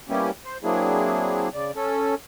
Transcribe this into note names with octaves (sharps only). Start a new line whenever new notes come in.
G3 A#3 B3 C#4 E4 G4
C5
F#3 A#3 C4 D4 E4 G#4
C#3 D5
C#4 A4